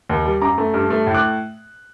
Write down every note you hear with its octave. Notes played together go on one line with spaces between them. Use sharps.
D#2
G3
F#2 A#5 D6
A3
G2
A3
A2
D6 F#6